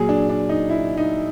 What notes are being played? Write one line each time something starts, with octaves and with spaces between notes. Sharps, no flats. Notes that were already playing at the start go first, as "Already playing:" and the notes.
Already playing: A#2 F#3 G#4
D4
D4
D#4
E4
D#4